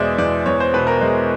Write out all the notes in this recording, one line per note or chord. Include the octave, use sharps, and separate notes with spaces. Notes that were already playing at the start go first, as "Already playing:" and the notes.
Already playing: E2 B2 G#3 C5 D5 E5
E2 D5
E2 C#5
C5
B2 B4
A#4
G#3